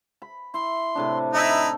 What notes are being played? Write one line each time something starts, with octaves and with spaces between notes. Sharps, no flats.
B5
E4 C6
A2 C3 D4
D#4 E4 A4 E5